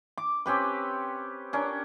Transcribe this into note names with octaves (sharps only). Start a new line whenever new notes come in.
D6
C4 C#4 G4 B4
C#4 D4 A#4